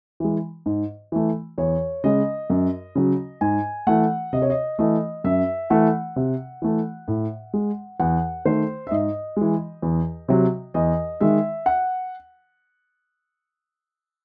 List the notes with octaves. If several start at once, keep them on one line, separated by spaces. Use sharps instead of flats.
E3 G#3
G#2
E3 A3
E2 C#5
C#3 G#3 D#5
F#2
C#3 F#3
G#2 G#5
E3 A3 F#5
C3 D#5
C#5
D#5
E3 A3 D#5
F#2 E5
E3 A3 F#5
C3
E3 A3
A2
G#3
E2 F#5
D#3 A3 C5
E5
G#2 D#5
E3 G#3
E2
C3 F#3
E2 D#5
D#3 G#3 E5
F#5